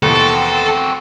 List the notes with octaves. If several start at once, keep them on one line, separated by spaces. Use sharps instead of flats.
D#2 B2 E3 C4 F#4 A4